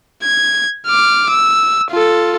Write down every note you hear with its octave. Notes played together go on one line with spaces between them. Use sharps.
G#6
D6 F6
E6
F4 A4